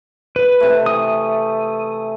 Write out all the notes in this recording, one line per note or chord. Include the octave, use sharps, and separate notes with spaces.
B4
C3 A3
E3 D#6